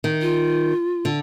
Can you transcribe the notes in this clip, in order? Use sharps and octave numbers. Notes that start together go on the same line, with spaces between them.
D#3
F4
D3